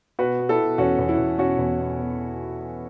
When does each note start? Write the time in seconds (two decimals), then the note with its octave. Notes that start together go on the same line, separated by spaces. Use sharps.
0.19 B2 F#4 B4
0.39 B3
0.49 E4 A4
0.59 B2
0.78 E2 C#4 F#4
0.99 E2
1.09 E4
1.18 E2
1.38 B2 C#4 F#4
1.59 E2
1.78 B2
1.99 B3